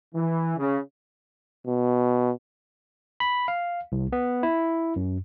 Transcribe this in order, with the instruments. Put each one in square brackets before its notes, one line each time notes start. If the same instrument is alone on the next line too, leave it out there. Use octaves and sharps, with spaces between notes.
[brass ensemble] E3
C#3
[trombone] B2
[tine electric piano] B5
F5
C2
B3
E4
F#2